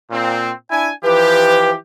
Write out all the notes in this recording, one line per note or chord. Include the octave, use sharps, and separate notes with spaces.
A#2 C4
D4 E4 G#5
E3 F3 G4 B4